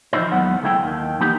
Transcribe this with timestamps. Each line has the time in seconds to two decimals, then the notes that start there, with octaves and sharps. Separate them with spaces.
0.13 E3 F3 C4 D#4 E4 C5
0.32 D#2 F#3 G#3 B3 F#5
0.63 D2 G#3 A3 E4 A4 G5
0.80 D#2 D#3
1.20 E3 A#3 B3 D#4 G4